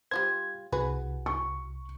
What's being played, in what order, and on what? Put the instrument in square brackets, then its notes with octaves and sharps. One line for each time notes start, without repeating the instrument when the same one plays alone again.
[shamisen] G3 F4 C5 [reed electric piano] G#6
[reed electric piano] C2 [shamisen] F#4 G#4 B4
[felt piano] C#6